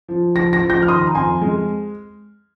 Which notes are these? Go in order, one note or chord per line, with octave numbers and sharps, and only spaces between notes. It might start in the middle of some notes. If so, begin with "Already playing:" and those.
F3
F3 A#6
A#6
F3
G6 A#6
F6
D#3 C6 D#6
A#5
F2 G#5 C6
G#3